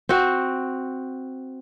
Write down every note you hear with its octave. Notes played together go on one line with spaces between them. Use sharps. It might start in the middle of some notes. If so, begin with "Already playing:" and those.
C4 F#4